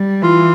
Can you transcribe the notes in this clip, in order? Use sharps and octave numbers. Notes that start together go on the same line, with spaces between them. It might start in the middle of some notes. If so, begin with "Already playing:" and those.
Already playing: G3
E3 F4